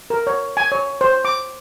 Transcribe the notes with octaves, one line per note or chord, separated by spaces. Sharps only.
A#4
C#5
G#5
C#5
C5
D6